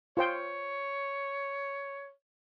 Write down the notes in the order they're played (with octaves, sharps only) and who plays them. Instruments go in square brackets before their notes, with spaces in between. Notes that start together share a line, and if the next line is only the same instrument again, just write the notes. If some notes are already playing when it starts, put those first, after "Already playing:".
[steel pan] F4 C5 G5 [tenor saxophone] C#5